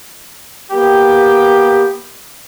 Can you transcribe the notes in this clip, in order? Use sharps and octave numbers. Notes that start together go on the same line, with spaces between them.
A#3 B3 G4